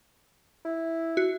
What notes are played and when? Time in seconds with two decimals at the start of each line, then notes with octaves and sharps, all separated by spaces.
0.65 E4
1.17 F#4